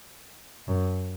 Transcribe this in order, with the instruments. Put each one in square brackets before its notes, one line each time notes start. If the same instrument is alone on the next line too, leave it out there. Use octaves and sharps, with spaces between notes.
[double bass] F#2